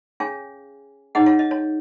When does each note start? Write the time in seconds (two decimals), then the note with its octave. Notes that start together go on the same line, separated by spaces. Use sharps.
0.20 C#4 G#4 C#5 F5 G#5
1.15 D#4 G#4 C#5 D#5 F#5
1.26 C#5 F5
1.39 D#5
1.51 C#5